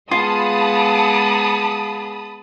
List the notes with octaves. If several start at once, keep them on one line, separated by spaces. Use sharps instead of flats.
G#3 B3 F4 G#4 A5 B5 D#6